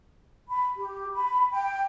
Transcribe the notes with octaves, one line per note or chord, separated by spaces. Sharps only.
B5
G4
B5
G5